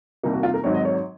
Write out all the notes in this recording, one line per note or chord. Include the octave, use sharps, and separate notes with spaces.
C2 C3 D#3 A#3 D#4
F#4
F4
A#4
G#1 G#2 F#3 C4 C#5
D#5
C#5
C#5